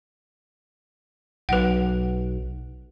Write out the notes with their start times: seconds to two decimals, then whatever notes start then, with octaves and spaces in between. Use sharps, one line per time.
1.49 B1 B4 F#5